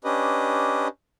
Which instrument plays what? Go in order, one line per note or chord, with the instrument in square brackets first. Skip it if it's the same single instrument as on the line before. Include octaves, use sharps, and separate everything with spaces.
[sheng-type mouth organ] C#4 D4 G4 B4 D#5